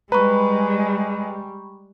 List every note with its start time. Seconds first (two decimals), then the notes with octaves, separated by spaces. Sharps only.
0.12 G3 G#3 B4 A#5 B5 C#6